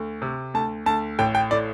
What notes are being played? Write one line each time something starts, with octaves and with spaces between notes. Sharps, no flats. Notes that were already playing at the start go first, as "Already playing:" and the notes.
Already playing: D2
C3
D2 A5
D2 A5
A1 G5
G5
A2 D5